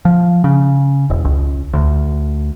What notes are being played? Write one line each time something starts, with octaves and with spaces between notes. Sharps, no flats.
F3
C#3
E1
C#2
D2